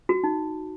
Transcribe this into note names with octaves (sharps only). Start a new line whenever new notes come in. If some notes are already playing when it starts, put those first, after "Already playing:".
F#4
D#4